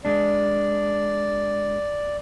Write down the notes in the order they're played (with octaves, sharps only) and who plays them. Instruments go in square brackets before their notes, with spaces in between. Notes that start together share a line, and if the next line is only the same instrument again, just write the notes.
[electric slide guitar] G#3 D4 [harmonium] D5